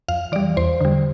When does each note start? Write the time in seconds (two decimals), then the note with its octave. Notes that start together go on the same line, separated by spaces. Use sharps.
0.08 F2 F5
0.32 E3 D5
0.36 G3
0.57 E2 C5
0.81 D3 G3